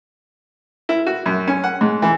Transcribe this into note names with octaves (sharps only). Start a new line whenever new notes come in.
E4
F#4
F#2
C#4
F#5
G#2
E3